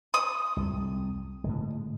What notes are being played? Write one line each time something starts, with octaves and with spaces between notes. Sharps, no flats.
D#6
C2 F2
A2 D3 G#3